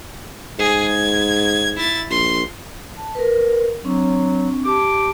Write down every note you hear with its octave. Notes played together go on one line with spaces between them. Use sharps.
G#2 G#4 G#5
G#6
E4 A6
A#1 C6
A5
A#4 B4
F#3 C4 D4 C#6
G4 A5 D6